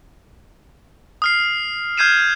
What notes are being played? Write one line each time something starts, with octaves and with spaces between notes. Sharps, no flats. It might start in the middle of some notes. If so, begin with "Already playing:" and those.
D#6 F6 C7
F6 G6 G#6 C7 D#7 E7